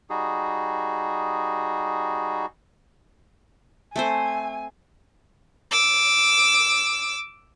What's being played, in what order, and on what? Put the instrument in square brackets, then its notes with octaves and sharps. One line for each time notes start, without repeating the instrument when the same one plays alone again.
[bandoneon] G3 D#4 F#4 G#4
[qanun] A3 C4 C5 [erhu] G#5
[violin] D6 E6